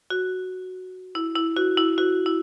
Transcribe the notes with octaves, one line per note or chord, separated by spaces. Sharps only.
F#4
E4
E4
F#4
E4
F#4
E4